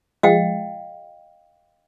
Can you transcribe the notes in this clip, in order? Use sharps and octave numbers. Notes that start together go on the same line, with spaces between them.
F3 G#3 D#5 F5 G5